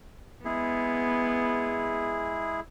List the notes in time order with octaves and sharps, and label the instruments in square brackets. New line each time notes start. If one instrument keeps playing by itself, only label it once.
[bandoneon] G#3 E4 G#4 [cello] B3